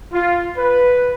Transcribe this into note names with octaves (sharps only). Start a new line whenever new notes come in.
F4
B4